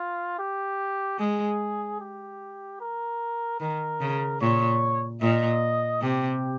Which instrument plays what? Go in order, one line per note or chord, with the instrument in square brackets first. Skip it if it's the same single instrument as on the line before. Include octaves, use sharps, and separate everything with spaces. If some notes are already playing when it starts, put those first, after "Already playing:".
Already playing: [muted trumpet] F4
G4
[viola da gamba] G#3 [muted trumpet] G#4
[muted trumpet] G4
A#4
[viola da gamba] D#3 [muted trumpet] A#4
[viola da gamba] C#3
[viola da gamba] A#2 [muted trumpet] C#5
[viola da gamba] A#2 [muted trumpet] D#5
[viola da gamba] C3 [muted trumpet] G4